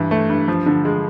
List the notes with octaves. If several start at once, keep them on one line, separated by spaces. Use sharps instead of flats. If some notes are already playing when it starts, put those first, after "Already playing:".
Already playing: G2 E3
A3
G2
F3
D3
G#3